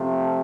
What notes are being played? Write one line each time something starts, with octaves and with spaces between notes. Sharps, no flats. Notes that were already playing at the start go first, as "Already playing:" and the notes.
Already playing: C3 F3 A3 C4